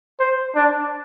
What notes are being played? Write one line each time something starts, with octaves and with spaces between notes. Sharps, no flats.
C5
D4